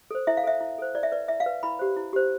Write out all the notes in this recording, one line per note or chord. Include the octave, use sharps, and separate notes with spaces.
A4 C5
E4 E5
F5
A4 C5 E5
E4
A4 C5
E4 D5
E5
B4 D5
E4 E5
F5
B4
E4 B5
G4 C5
E4
G4 C5